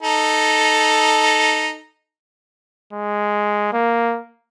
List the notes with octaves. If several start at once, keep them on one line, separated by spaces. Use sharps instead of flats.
D#4 A4
G#3
A#3